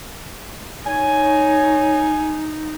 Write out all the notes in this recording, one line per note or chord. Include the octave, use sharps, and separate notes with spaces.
D#4 C#5 G#5